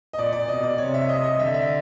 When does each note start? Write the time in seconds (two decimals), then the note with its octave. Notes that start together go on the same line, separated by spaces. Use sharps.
0.13 D#5
0.17 A#2 D5
0.33 D5
0.48 B2 D#5
0.63 D5
0.78 C3 C#5
0.94 E5
1.09 D#5
1.23 D#5
1.38 D3 E5
1.54 E5